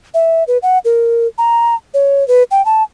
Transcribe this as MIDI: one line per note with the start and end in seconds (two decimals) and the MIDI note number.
0.14 0.44 76
0.48 0.58 71
0.63 0.78 78
0.85 1.27 70
1.38 1.75 82
1.94 2.26 73
2.28 2.43 71
2.51 2.64 79
2.65 2.83 81